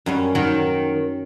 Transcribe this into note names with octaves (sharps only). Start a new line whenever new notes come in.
F#2 G3 C#4
D#3 F#3